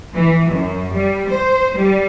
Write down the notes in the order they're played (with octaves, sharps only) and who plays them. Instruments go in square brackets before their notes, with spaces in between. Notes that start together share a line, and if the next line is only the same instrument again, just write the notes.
[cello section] E3
F#2
G3
C5
G3